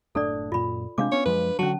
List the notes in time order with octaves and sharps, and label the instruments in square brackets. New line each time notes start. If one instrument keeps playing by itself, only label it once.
[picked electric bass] F#1 A2 D4 [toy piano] A4 D5
[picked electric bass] F#2 A#2 [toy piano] F4 B5
[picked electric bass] C3 G#3 C4 [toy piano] D4 F5 D6
[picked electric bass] B3 C#4 [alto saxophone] C#5
[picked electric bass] F#2 F3 G#3 [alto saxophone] B4
[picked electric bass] D3 D#3 F#3 [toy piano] C#4 A5 [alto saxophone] F#4